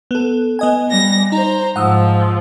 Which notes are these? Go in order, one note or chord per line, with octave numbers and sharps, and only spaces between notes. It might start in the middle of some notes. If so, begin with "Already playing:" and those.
B3 A4
B3 D#5 G#5
G3 A#6
D#4 C5 A#5
G#2 F3 F#5 D#6 E6